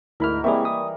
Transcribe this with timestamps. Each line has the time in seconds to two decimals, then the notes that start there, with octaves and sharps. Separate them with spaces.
0.20 D2 G#2 E4 A#4 B5 F6
0.44 E3 G3 A#3 C4 E4 G#4 E5 C#6
0.65 D#6